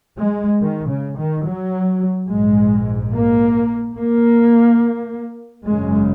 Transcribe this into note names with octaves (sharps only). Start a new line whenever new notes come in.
G#3
D#3
C#3
D#3
F#3
A#1 G#2 G#3
A#3
A#3
G#1 F#2 C#3 G#3